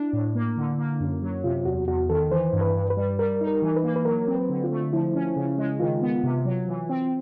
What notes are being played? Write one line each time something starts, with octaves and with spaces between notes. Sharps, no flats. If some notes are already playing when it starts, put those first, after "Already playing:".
Already playing: D4 E4
A2
A#3
D3
A#3
F#2
F#3
C3 F4
E2 F#4
E2 F#4
D#3 A4
E3 C5
G2
B4
G2
B4
G3
G3 A#4
D#4
A#4
E3
B4
A#3
B4
F#3 A#4
C4
B4
D3
F4
A3
F3 E4
C#4
C#3
G#3
D#3 F4
B3
C3
F#3
E3
C4